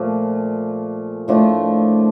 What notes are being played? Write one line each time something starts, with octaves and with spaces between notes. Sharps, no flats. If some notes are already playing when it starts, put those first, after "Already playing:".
Already playing: A#2 F3 A3
A2 F3 A3 D4